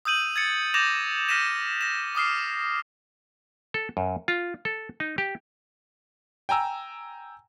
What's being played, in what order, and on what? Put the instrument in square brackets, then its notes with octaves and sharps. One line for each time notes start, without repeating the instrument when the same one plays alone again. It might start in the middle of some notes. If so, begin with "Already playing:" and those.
[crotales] D#6 E6 G6 D#7 F#7
G#6 A6 C#7
D6 G6 A6 A#6 E7 F7
F6 G6 A#6 B6 D#7 E7
A#6 E7
D6 D#6 F6 C7
[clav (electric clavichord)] A4
F#2
F4
A4
D#4
G4
[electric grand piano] G5 G#5 A#5 E6